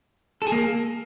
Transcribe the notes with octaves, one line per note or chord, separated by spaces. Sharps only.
A4
G#4
A#3